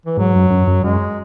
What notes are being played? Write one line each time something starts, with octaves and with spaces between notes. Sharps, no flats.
E3
G#2 F#3
F#2
F#2
F#2
F#2 G#3